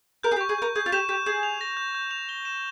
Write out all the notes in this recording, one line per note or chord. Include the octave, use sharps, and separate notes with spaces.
A#4 G6
G#4
G4
C#6
G#4
A#4 G6
G#4 G6
F4
G4 E7
G4 G6
G#4 G6
F7
A#6
G6
G6
F7
G7
E7